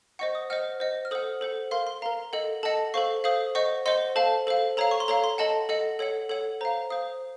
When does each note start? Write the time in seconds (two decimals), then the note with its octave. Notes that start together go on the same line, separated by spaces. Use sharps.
0.19 C5 D#5 F#5 C#6
0.35 D#6
0.50 C5 D#5 F#5 F6
0.80 C5 D#5 F#5
1.05 F6
1.11 A4 C5 F#5 D#6
1.41 A4 C5 F#5
1.71 A#4 F5 C6
1.87 C6
2.02 A#4 F5 A#5
2.33 A4 D#5 F#5
2.63 A4 D#5 F#5 A5
2.94 A4 C5 F5 C#6
3.24 A4 C5 F5 D#6
3.55 C5 D#5 F#5 C#6
3.86 C5 D#5 F#5 C6
4.16 A4 C5 F5 A5
4.47 A4 C5 F5
4.77 A4 C#5 F5 A#5
4.91 C#6
5.00 C6
5.08 A4 C#5 F5 A#5
5.24 C6
5.38 A4 D#5 F#5 A5
5.69 A4 D#5 F#5
5.99 A4 C#5 F#5
6.29 A4 C#5 F#5
6.61 C5 F5 A#5
6.90 C5 F5 D#6